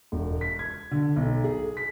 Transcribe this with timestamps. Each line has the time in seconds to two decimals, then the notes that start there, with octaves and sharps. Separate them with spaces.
0.12 E1
0.41 B6
0.59 G#6
0.91 D3
1.16 B1
1.44 G#4
1.77 B6